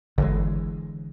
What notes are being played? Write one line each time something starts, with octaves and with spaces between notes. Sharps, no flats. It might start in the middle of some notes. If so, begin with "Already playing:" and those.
G1 D3 E3 G#3